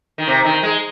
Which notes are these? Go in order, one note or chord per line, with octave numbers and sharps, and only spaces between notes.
D#3
C3
D#3
G#3